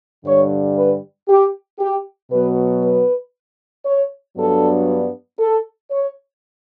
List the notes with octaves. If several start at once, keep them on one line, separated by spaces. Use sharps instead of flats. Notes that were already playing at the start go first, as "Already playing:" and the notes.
G2 D3 G3 C#5
B4
G4
G4
B2 F#3 B3 B4
B4
C#5
G2 F#3 B3 D4 A4
A4
C#5